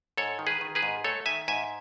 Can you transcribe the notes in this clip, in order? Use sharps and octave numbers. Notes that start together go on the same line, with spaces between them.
G#2 A4 C#5
D#3
G#4 B4
D#3
G#4 B4
G#2
A3 A4 C#5
D#3 E5 G#5
G#2 E5 G#5